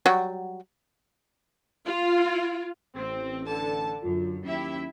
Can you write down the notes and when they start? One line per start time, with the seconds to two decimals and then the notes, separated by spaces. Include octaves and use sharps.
0.06 F#3 G3 F#4
1.87 F4
2.96 A1 C4
3.45 D3 A5
4.04 F#2 D3 F#3 F4
4.45 D#2 F#3 C#4 E4 G4 E5